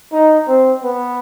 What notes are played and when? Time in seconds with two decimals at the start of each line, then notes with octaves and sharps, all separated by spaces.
0.12 D#4
0.48 C4
0.83 B3